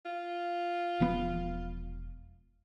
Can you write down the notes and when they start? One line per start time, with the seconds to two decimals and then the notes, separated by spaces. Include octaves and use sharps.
0.05 F4
1.00 E1 F3 B3